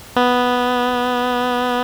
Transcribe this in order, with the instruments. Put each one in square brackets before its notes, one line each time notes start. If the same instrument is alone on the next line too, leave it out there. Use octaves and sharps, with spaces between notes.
[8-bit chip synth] B3